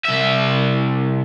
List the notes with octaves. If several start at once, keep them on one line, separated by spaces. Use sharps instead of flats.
C2 E5